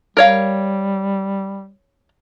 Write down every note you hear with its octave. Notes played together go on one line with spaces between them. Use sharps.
G3 A#4 C#5 F5